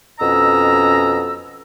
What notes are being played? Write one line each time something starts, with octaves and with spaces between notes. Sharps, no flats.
F2 B2 C#4 D#5 A#5 E6